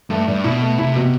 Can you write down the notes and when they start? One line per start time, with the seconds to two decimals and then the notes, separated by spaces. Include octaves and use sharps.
0.10 G2 A3
0.27 G2 D4
0.44 B2 E4
0.61 A3
0.78 C3 E4
0.96 B2